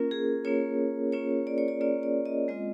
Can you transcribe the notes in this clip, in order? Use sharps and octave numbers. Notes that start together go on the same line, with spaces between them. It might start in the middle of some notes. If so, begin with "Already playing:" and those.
Already playing: A#3 C#4 F4 A#4
G#4
A#3 C#4 F4 C#5
A#3 C#4 F4 C#5
D5
C#5
D5
A#3 C#4 F4 D5
D5
D#5
G#3 C4 F4 D#5